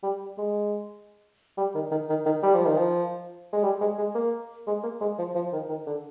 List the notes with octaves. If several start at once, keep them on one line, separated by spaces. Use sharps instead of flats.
G3
G#3
G3
D#3
D#3
D#3
D#3
G3
F3
D#3
F3
G#3
G3
G#3
G#3
A#3
G#3
A#3
G#3
F3
F3
D#3
D#3
D3